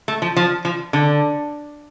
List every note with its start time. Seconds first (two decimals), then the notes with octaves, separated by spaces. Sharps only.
0.08 A3
0.22 F3
0.36 F3
0.65 F3
0.93 D3